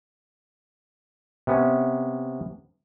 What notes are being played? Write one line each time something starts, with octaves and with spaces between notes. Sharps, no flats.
C3 B3 C#4